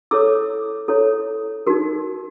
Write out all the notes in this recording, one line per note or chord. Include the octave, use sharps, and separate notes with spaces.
E4 A4 C#5 D6 E6
E4 A4 C#5
D#4 F#4 A#4